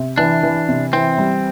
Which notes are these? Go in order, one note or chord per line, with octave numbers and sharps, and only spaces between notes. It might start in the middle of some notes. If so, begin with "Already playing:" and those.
Already playing: C3
E3 D4
E3
C3
E3 C4
G3